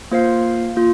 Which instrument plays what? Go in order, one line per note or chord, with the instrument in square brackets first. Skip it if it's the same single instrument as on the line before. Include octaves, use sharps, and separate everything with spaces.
[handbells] A#3 F4 C5 F5
A#3 F4